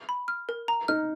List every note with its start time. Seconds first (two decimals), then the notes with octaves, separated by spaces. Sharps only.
0.09 B5
0.28 F6
0.49 A#4
0.68 A#5
0.88 D#4 F6